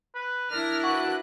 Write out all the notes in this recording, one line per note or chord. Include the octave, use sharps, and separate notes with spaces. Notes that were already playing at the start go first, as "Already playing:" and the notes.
B4
D4 E4 A#4 F6 A#6
F#4 B4 F#6